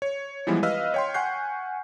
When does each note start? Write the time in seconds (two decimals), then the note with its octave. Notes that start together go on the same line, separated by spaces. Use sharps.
0.02 C#5
0.47 E3 F3 G3 G#3 B3 E4
0.63 B4 D#5 F5 E6 F6 B6
0.94 C#5 G5 C6
1.14 F#5 G#5 C#6 F#6 G6 C7